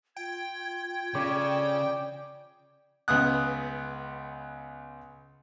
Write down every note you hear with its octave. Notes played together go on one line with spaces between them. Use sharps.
F4 G5 G#6
C#3 D5
C#2 B3 D#6 F#6